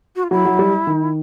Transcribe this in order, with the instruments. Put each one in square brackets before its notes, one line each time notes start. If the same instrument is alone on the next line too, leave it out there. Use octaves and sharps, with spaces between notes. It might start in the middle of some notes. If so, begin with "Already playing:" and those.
[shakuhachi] F#4
F4
[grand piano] F#3 [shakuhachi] E4
[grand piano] F#3
G3
D#3